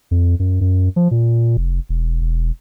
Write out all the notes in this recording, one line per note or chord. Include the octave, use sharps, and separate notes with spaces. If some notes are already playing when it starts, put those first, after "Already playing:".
F2
F#2
F#2
F3
A#2
F1
E1
E1